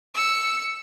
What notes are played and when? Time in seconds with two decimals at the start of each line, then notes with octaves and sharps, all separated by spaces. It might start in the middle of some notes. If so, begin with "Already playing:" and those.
0.14 E6 C#7